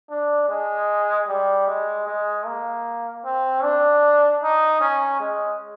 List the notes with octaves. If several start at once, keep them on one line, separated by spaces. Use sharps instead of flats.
D4
G#3
G3
G#3
G#3
A#3
C4
D4
D#4
C#4
G#3